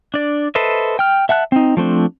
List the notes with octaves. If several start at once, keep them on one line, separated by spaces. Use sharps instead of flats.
D4 D5
A4 B4 C5 D#5 E5
G5 F6
E5 F#5 A5 F#6
C4 D#4
F3 A3 C4 D4